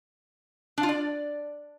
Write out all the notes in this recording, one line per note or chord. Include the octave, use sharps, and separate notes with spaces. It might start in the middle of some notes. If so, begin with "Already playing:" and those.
D4
F4
D5